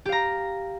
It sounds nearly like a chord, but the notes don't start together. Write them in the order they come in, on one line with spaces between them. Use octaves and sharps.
G4 F5 A#5